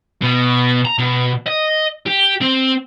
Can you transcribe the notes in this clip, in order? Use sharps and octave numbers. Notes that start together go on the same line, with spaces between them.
B2
A#5
B2
D#5
G4
C4